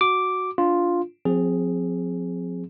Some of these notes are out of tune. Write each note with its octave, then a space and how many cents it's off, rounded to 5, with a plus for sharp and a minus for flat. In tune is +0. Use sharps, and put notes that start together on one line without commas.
F#4 +0 D6 +0
D4 -15 F4 +0
F3 +35 C4 -10 G#4 +0